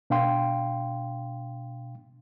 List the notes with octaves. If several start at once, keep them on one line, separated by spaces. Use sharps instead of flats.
B2 D4 F5 G5 C6